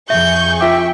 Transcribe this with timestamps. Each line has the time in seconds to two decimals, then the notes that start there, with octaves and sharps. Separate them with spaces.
0.10 F2 G#4 E5 C#6 G6
0.61 F4 E5 G5 D6